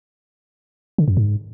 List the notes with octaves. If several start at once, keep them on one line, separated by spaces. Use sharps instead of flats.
D3
F#2
G#2